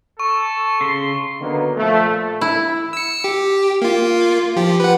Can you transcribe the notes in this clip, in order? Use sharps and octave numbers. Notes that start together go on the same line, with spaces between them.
A4 C#6
C#3 C6
D3 D#3 F#3 A#3 B3
A#2 F3 A3
E4
E6 C#7
G4
A#3 F4
F3 G4
B4 F#5